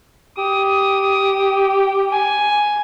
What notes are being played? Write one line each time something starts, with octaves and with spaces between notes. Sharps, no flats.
G4 D#6
G#5